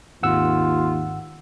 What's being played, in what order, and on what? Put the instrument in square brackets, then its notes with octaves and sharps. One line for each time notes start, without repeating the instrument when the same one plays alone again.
[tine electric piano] G#1 F#5 E6 [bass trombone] D#2 [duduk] F4